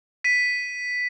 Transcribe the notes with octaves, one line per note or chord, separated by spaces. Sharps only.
B6 D#7